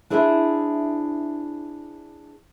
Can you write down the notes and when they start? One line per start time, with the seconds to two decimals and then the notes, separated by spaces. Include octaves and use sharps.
0.10 D4 E4 G#4 C5 D#5 E5